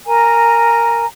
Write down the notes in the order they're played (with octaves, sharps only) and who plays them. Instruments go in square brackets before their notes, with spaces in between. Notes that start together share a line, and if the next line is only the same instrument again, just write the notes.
[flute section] A#4 G#5 A#5